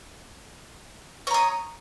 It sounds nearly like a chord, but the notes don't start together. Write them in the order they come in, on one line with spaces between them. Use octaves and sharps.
C#5 A#5 D#6